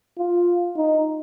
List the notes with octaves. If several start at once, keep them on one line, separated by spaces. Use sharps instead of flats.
F4
D#4